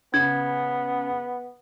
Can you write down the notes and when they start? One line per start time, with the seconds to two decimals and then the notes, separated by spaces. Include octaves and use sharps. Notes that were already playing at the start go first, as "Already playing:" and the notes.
0.14 C#3 B3 G#6